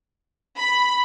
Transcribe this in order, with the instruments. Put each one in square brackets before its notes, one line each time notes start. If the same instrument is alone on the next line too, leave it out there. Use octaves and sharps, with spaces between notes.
[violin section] B5